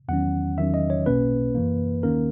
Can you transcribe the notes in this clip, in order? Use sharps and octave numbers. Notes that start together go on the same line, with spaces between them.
E2 D#3 F#3 C#4 F#5
E2 D#3 F#3 C#4 E5
D#5
C#5
B1 B2 A#3 C#4 B4
F#2 E3 A#3
D#2 D#3 A#3 C#4 A#4